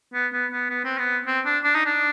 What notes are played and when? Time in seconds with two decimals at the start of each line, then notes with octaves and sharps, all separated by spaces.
0.14 B3
0.33 B3
0.52 B3
0.70 B3
0.84 C4
0.98 B3
1.27 C4
1.46 D4
1.64 D4
1.75 D#4
1.86 D4